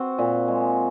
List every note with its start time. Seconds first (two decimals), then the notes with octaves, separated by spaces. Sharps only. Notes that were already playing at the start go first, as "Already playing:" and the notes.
Already playing: C4 F#4
0.18 A#2
0.48 G#3